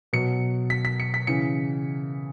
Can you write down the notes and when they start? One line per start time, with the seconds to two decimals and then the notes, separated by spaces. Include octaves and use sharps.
0.13 B2 F#3 C#7
0.70 B6
0.85 B6
1.00 C#7
1.14 B6
1.27 C#3 E3 C#7